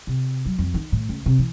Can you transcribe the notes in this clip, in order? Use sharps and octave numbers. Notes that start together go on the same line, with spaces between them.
C3
F#3
F2
D#3
A2
C#2
C3
E3